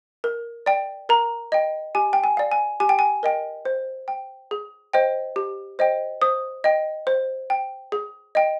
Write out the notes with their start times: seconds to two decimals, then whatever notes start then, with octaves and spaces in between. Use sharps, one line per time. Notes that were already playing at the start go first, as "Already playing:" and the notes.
0.24 A#4
0.66 D5 G5
1.09 A#4 A#5
1.52 D#5 G5
1.95 G4 G#5
2.13 G5
2.24 G#5
2.37 D5 F5
2.52 G#5
2.80 G4 G#5
2.89 G5
2.99 G#5
3.23 A#4 D#5 G5
3.65 C5
4.08 G5
4.51 G#4
4.93 C5 D#5 G5
5.36 G4
5.79 C5 D#5 G5
6.22 C5 D#6
6.64 D#5 G5
7.07 C5
7.50 G5
7.92 G#4
8.35 D#5 G5